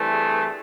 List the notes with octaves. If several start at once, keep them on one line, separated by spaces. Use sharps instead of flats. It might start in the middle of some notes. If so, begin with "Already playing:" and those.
Already playing: G2 E3 A3 C4
G#4